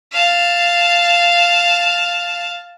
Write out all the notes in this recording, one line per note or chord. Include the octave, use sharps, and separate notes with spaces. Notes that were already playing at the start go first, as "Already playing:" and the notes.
F5 A5